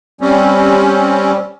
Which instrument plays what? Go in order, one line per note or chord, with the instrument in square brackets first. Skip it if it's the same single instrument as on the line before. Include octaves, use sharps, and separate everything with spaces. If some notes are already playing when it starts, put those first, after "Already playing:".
[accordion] G3 C4 C#4